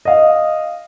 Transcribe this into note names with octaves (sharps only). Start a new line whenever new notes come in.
D#5 F5